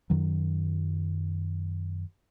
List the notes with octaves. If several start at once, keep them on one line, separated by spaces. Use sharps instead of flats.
F#2 D#3 F#3